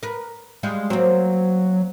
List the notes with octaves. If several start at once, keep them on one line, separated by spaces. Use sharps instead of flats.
A#4 B4
G3 G#3 F4
F#3 A#3 C4